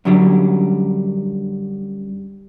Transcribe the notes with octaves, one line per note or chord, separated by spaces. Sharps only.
F#2 D3 F#3 G3